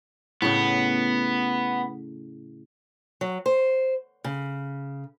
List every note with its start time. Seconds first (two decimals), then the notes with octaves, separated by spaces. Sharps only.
0.42 A2 C#3 B3
3.21 F#3
3.46 C5
4.24 C#3